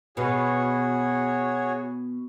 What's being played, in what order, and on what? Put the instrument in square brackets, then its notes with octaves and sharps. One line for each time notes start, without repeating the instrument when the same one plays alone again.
[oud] B2 [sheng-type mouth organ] F#4 G#4 C#5